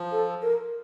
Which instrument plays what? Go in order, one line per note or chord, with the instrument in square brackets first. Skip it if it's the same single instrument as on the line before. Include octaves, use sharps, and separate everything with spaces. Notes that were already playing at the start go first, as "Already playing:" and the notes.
Already playing: [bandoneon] F3
[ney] A4
A#4